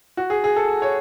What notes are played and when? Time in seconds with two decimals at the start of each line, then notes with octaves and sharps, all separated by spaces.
0.17 F#4
0.30 G#4
0.44 G#4
0.56 A4
0.82 C#5